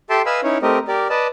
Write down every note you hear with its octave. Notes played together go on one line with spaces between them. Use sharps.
G4 A4 E5 G5 A5 C6
B4 D#5 F5 G#5 B5 E6
C#4 D#4 E4 C#5
A3 C4 G4 A#4 D#5
G4 A#4 D5
B4 D5 D#5 A5